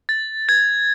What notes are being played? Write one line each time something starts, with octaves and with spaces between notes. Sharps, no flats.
A6
G#6